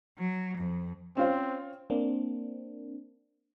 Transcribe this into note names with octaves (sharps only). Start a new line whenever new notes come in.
F#3
F2
C4 C#4 F4 C5
A#3 C4 D4